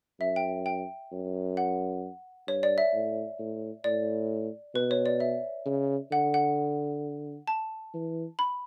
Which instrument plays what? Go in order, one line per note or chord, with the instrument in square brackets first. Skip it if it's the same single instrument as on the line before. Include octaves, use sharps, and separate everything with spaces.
[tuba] F#2 [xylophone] E5
[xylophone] G5
G5
[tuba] F#2
[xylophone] F#5
[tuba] G2 [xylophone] C#5
[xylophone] D5
E5
[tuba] A2
A2
[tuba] A2 [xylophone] D5
[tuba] B2 [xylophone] B4
[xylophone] C#5
D5
E5
[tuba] C#3
[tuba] D3 [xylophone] F#5
[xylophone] F#5
A5
[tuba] E3
[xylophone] B5